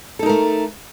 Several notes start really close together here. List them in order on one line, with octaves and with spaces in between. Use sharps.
A4 D#4 A#4 A3